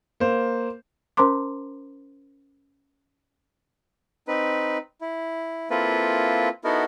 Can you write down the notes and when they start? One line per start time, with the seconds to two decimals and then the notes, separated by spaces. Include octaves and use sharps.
0.20 A#3 C5
1.17 C#4 A#4 C5 A#5 C6 D6
4.28 C4 D#4 B4
5.01 E4
5.70 A#3 C4 E4 F4 A4 B4
6.64 B3 D#4 E4 F#4 A4 A#4